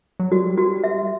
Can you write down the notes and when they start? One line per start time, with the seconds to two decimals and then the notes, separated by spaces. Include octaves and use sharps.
0.20 F#3
0.31 G3 F#4
0.58 F#4
0.84 E5